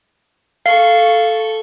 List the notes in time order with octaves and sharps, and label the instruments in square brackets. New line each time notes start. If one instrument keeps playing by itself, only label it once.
[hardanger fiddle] A4 C#6 [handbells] F5